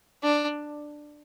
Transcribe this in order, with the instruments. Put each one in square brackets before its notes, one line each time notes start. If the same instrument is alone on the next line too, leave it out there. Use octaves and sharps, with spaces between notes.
[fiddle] D4